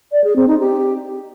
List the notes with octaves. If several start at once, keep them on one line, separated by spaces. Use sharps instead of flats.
D5
G#4
C4
D#4
G4